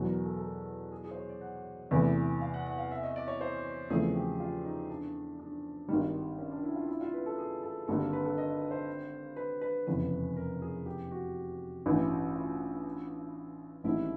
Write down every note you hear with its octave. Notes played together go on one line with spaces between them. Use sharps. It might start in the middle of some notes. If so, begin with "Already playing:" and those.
Already playing: E2 B2 F#3 B4
A#4
A4
A4
G#4
G#4
G#4
C5
C#5
D5
F#5
E2 C3 E3 A3
F5
F#5
F#5
F5
E5
D#5
D5
C#5
C5
E2 C#3 F3 A3 C4 G#4
G4
F4
D#4
D4
D4
G#1 G2 D#3 G3
C#4
D4
E4
F4
E4
F4
B4
A4
G#4
A4
G#1 G2 D3 G3 A#3 A4
A#4
B4
A4
D#5
C5
B4
B4
F1 E2 C#3 B4
A#4
G#4
G4
F#4
A1 G2 E3
F4
A1 G#2 D#3 G3 C4 E4